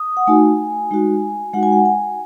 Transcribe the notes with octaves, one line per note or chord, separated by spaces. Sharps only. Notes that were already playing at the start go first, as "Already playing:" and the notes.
Already playing: D#6
F#5
A3 D#4 F#4 G#5
G#3 D#4 F#4
G#3 D#4 F#4 F#5
G#5
F#5
G#5